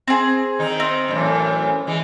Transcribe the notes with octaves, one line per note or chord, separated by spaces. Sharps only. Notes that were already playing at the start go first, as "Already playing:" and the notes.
C4 G#4
D#3 D#4
C4
F#2 A2 E3
E3 G#3